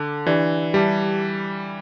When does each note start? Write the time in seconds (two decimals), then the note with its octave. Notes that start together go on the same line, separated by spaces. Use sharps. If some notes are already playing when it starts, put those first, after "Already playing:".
Already playing: D3 A4 A5 D6
0.26 E3 D4 G4 D5
0.74 G3 G4 E5 A5 D6